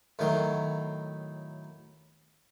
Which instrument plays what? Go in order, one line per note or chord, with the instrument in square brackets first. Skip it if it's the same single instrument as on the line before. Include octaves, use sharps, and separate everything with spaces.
[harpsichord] A2 D#3 F#3